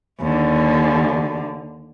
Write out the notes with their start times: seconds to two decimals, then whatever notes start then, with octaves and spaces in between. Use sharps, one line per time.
0.20 D#2 D3